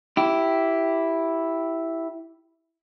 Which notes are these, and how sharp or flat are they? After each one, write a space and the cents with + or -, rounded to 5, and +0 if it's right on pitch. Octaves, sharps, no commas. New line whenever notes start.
E4 +0 G4 -10